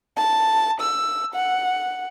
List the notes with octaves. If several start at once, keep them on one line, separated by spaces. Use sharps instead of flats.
A5
E6
F#5